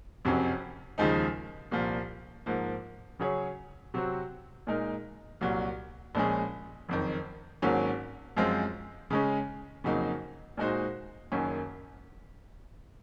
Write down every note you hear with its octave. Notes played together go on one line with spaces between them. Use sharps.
F#1 F2 C3 F#3 C#4
D#2 C#3 F3 G#3 D#4
C2 A#2 F3
G#2 F3 A#3
C#3 F#3 C#4 G#4 C#5
C3 F#3 C4 F#4
A#2 G#3 D#4 A#4
C2 A#2 F#3
A#1 A#2 G#3 C#4 G#4
F#1 F2 D#3
G#1 G#2 F#3 A#3 C#4
F#2 F3 G#3 C4 F4
C#3 G#3 C#4
F2 C#3 F#3 A#3 D#4
A#2 G#3 D#4 F#4 C5
F#1 F#2 D#3 A#3 C#4